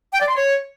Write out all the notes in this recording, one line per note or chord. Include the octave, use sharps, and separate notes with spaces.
G5
D5
C6
C#5